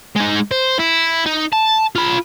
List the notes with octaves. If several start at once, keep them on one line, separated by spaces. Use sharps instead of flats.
G#3 D#4
C5
E4
D#4
A5
F4 B5